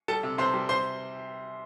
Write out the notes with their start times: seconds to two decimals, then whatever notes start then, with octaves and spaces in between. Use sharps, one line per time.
0.08 G3 A4 A5
0.23 C3
0.38 C3 C5 C6
0.54 G3
0.69 C3 C5 C6